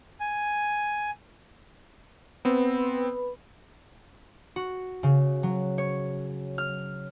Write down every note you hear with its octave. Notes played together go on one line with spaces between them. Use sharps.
G#5
B3 C4 B4 B5
F#4
C#3
F#3
C#5
F6